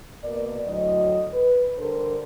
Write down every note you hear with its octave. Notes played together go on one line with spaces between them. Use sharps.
B2 A#3 A#4 D5
D2 A2 F#3 D#5
B4
D3 G3 D4 A4 A#4 C5